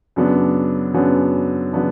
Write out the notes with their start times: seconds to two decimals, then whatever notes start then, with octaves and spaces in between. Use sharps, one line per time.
0.16 F#2 C#3 F#3 B3 D4
0.94 F#2 C#3 F#3 B3 D4
1.73 C#3 F#3 B3 D4